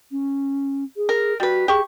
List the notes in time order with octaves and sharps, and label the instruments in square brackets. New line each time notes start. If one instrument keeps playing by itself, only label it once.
[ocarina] C#4
G#4
[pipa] A#4
[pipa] G3 B4 [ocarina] F#4
[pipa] G4 C#6 [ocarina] G#4